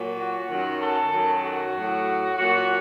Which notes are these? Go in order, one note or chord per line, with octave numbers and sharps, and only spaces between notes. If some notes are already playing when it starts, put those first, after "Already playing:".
Already playing: A#2 F#3
F#4
F#2 D#3 F#3
A4
F#2 D#3 F#3
F#4
A2 F#3
A#2 F#3 F#4